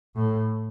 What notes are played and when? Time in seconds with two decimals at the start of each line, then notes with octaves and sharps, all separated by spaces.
0.16 A2